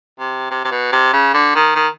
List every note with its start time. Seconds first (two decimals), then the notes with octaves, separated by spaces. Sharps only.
0.19 C3
0.51 C3
0.64 C3
0.71 B2
0.92 C3
1.13 C#3
1.34 D3
1.55 D#3
1.76 D#3